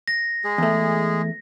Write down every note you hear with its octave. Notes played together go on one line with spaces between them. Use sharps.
A#6
G#3 G#4
E2 A3